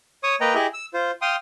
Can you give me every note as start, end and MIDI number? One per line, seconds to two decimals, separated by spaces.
0.23 0.35 73
0.23 0.35 85
0.23 0.35 87
0.41 0.54 58
0.41 0.54 71
0.41 0.54 75
0.41 0.54 79
0.41 0.54 82
0.55 0.67 64
0.55 0.67 67
0.55 0.67 68
0.55 0.67 75
0.55 0.67 76
0.74 0.86 88
0.94 1.11 65
0.94 1.11 72
1.22 1.36 77
1.22 1.36 79
1.22 1.36 84
1.22 1.36 87